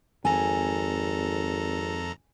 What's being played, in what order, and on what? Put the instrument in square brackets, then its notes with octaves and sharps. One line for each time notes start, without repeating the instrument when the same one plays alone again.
[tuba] G#1 [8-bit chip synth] F2 A4 A#5 [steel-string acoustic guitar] G#5